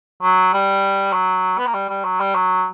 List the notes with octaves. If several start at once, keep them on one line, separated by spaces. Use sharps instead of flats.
F#3
G3
F#3
B3
A#3
G3
G3
F#3
G3
F#3